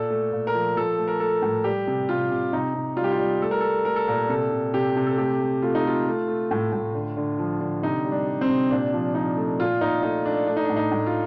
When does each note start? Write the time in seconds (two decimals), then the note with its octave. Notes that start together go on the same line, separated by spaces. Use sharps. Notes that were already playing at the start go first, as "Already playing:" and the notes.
Already playing: A#2 A4
0.10 A3
0.32 A#2
0.47 A#4
0.54 F3
0.77 F3 A4
0.98 A3
1.08 A#4
1.20 A3 A4
1.42 A2
1.64 G3 G4
1.87 C3
2.09 C3 F4
2.31 C3
2.52 C3 D#4
2.75 C3
2.97 G3 F4
3.04 G4
3.12 F4
3.19 G3
3.41 A3 A4
3.51 A#4
3.61 A3 A4
3.85 A3 A#4
3.96 A4
4.08 A#2 A#4
4.29 C3 A4
4.52 C3
4.73 C3 G4
4.96 C3
5.07 A4
5.18 A3 G4
5.40 A3
5.62 A3 F4
5.75 D#4
5.84 A3 F4
6.07 A3
6.28 A3
6.51 A2
6.72 A2
6.94 D3
7.17 D3
7.39 F3
7.61 D3
7.83 C3 D#4
8.05 G3
8.12 D4
8.27 G3
8.41 C4
8.49 C3
8.71 A#2 D4
8.93 F3
9.15 F3 D#4
9.37 A3
9.59 A#2 F4
9.81 A#2 D#4
10.03 A3 D#4
10.25 A3 D4
10.47 A3 D4
10.57 D#4
10.65 A2 D4
10.76 D#4
10.91 A2
11.06 F4